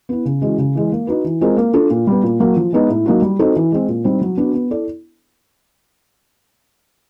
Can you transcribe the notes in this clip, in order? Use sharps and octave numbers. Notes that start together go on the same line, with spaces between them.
B3 E4
C#3
E3 G#3 C#4 F#4
C#3
E3 G#3
A#3
D#4 F#4 B4
E3
G#3 C4 F4 A#4
A#3
D4 F4 A4
A#2
G3 B3
A#2
F#3 A#3
F3
G#3 B3 D#4
A2
F#3 A#3 D#4 F#4
G3
C4 D#4 F#4 A4
E3
G#3 C4
A#2
G3 C4 D#4
F#3
B3 D4 F#4
B3
E4 A4 D5